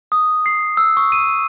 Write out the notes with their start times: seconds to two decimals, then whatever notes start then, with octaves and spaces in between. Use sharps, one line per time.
0.12 D#6
0.46 C7
0.77 E6
0.97 C#6
1.12 D#7